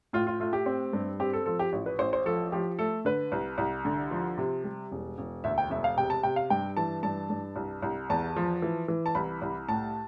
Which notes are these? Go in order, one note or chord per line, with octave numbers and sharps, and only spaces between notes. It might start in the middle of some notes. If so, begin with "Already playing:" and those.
A2 F4
F4
A3 F4
G4
C4
G2
C4 G4
A4
F3 A4
G4
A1
B4
A1 C5
C5
F3 A4
F3 G4
A3 A4
D3 B4
C2
C2
D3
F3
C3
G3
E1
E1
D2 E5
G5
E1 E5
F5
C3 G5
A5
C3 G5
F5
G2 G5
E3 A5
G2 A5
G2
C2
C2
E2 A5
F3
E3
E3
A5
C2 B5
C2
A2 A5